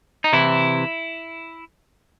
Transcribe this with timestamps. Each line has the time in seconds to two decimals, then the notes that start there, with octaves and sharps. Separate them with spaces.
0.24 D#4
0.33 C3 E3 E4